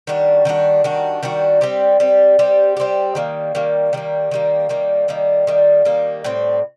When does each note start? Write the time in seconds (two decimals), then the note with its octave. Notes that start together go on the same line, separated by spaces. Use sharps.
0.07 D#3 G3 D4 F#4
0.45 D#3 G3 D4 F#4
0.84 D#3 G3 D4 F#4
1.23 D#3 G3 D4 F#4
1.61 G3 C4 G4
2.00 G3 C4 G4
2.39 G3 C4 G4
2.77 G3 C4 G4
3.15 D#3 G3 A#3
3.55 D#3 G3 A#3
3.93 D#3 G3 A#3
4.31 D#3 G3 A#3
4.69 D#3 G3 A#3
5.08 D#3 G3 A#3
5.47 D#3 G3 A#3
5.85 D#3 G3 A#3
6.24 A2 G3 C4